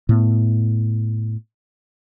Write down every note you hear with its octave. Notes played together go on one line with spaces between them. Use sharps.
A2 B3